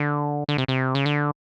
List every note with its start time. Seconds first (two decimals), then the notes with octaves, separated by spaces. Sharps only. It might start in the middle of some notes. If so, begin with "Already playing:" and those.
Already playing: D3
0.49 D3
0.58 C3
0.68 C3
0.95 C#3
1.06 D3